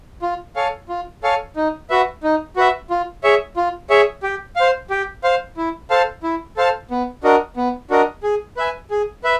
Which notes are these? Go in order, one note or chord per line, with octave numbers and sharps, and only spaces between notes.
F4
A4 C#5 F5 G#5
F4
A4 C#5 F5 G#5
D#4
F#4 B4 E5
D#4
F#4 B4 E5
F4
G#4 C#5 E5
F4
G#4 C#5 E5
G4
C5 F5
G4
C5 F5
E4
A4 C5 F5 A5
E4
A4 C5 F5 A5
B3
D4 F#4 A#4 D#5
B3
D4 F#4 A#4 D#5
G#4
B4 E5 G#5
G#4
B4 E5